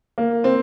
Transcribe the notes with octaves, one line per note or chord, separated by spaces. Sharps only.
A#3
C4